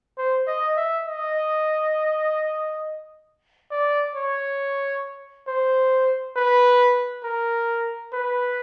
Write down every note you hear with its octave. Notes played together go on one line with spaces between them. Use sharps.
C5
D#5
E5
D#5
D5
C#5
C5
B4
A#4
B4